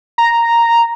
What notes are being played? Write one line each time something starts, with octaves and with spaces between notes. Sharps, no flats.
A#5